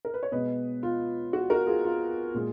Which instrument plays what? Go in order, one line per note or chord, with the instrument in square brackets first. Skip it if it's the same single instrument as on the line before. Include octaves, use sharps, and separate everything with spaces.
[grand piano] A#4
B4
C#5
B2 G#3 B3 B4 D#5
F4
F#4
F#4 A#4
F4 G#4
F4
A#2 G#3